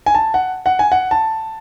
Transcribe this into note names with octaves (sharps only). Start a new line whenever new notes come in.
G#5
A5
F#5
F#5
G#5
F#5
A5